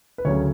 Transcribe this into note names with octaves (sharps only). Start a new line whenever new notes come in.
B4
D2 C#3 F#3 A3 C#5